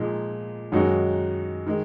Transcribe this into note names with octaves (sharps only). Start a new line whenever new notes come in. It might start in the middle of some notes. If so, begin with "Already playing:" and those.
Already playing: A#2 F3 G#3 D#4
F#2 D#3 G#3 D#4 F#4
D#3 G#3